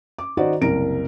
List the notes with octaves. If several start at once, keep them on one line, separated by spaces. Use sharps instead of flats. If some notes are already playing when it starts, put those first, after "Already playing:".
D6
D#3 F#4 C5 D5 D#5
F#1 C2 A#4 D7